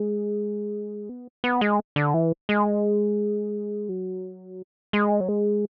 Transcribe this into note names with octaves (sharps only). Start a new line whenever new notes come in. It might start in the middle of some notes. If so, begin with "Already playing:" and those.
Already playing: G#3
B3
B3
G#3
D3
E3
G#3
F#3
G#3
F#3
G#3